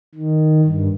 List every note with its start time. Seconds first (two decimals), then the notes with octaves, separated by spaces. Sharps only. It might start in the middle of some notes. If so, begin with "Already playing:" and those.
0.14 D#3
0.65 G2